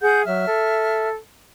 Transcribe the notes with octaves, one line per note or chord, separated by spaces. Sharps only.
G#4 F#5 G6
F#3 E5 F6
A4